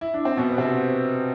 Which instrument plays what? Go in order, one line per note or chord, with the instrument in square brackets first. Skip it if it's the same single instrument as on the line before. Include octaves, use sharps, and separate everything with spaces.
[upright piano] E4
D4
C4
B2 B3
B3
C3 C4